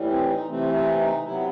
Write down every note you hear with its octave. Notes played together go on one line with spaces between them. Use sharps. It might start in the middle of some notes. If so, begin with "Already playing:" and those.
Already playing: A2 E3 G3
C4
D#4
C3 E3 A3 C4
C4
D#4
C3 F#3 B3 E4